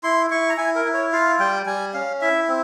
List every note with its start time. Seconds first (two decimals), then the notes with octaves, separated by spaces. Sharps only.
0.03 E4 C6
0.30 E4 C#6
0.50 A#5
0.57 E4 G#5
0.75 A#4
0.85 E4
0.94 C#5
1.12 F4 F5
1.40 G3 G5
1.66 G3 G#5
1.94 C#4 F5
2.21 E4 E5
2.48 C4